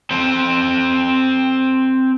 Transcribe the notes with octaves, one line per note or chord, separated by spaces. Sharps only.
C4 A4